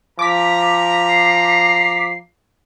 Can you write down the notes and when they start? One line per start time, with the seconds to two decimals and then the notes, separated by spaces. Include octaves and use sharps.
0.19 F3 A#5 D6 B6
1.09 C7